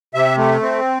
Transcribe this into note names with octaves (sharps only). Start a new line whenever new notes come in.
C3 E5
A3
C4